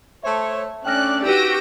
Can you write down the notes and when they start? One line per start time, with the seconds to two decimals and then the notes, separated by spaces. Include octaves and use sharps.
0.23 A3 C5 C#5 E5 A5
0.85 A3 C#4 D4 D5 G5 F6 F#6 A#6
1.25 D#4 F#4 G4 B4 E6 A#6 D7 D#7